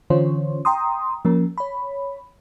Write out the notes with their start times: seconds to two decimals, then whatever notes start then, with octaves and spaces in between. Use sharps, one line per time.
0.10 D3 E3 C#4 F4 C5 C#5
0.65 G5 A#5 C6 D#6
1.25 F3 A#3 C#4 A#4
1.58 C#5 B5